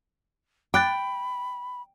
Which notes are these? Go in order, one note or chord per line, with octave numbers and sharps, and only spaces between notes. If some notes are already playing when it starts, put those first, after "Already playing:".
G5 B5 D6 F#6 A6